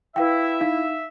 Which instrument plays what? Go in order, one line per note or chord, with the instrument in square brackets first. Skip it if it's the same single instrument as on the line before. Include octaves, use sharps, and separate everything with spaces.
[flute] E4 [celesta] B4 F5 G5 [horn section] E5
[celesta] D#4 F5